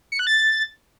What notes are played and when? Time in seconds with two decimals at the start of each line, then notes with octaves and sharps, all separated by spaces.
0.12 C#7
0.19 F#6
0.27 A6